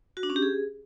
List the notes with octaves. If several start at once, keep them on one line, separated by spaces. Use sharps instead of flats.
F#4
D4
C#4
G4
G#4